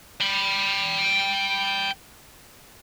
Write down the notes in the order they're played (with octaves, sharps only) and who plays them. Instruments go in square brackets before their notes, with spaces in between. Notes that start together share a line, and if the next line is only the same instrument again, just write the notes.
[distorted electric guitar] G5 B5